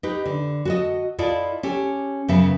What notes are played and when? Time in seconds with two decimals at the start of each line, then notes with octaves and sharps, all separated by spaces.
0.03 D#4 G4 B4
0.26 D3
0.65 F#4 A4 D#5
1.18 E4 F4 A4 D5 D#5
1.63 C#4 G4 A4
2.28 F#2 C#3 B3 G#4 E5